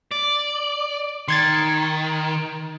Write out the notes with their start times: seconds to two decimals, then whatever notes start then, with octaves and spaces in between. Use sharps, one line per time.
0.11 D5
1.28 D#3 C6 G#6 A6